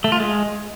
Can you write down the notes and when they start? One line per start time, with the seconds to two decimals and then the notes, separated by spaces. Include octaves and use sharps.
0.04 A3
0.12 F4
0.20 G#3